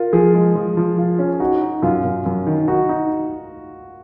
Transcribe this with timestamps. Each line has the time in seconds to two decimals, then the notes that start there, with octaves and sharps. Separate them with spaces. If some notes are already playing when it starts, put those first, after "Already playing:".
Already playing: F4 A#4
0.13 F3 G#4
0.34 G#3
0.55 F3
0.77 F3
0.98 F4
1.19 C#4
1.40 D#4 F#4
1.62 D#4
1.82 F#2 F4
2.04 F#2
2.26 F#2
2.47 D#3
2.68 D#4 F#4
2.89 D#4